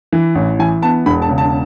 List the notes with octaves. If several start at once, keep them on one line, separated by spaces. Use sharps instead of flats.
E3
A1
E3 G#5
B3 A5
E1 B5
A5
C#3
A5